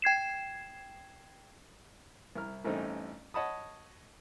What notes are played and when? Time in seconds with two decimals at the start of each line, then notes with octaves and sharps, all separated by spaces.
0.02 G5 G#6 C7 E7
2.35 C2 E4 A#5 F6
2.64 A1 G2 A3 C4 C#4 D#4
3.34 C#5 D#5 F#5 A5 B5 D#6